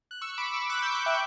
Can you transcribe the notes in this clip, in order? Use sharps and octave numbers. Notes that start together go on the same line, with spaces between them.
F#6
C#6 E6
B5 D6
C#6 E6
D6 F#6
E6 G6
D6 F#6
E5 G5